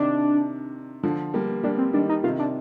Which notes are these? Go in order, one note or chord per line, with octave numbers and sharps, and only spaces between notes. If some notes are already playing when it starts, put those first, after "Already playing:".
Already playing: C3 D#3 D4
D3 F3
G3 A#3
G3 A#3 D4
C4
D#3 G3 D4
D#4
C3 D#3 F4
D4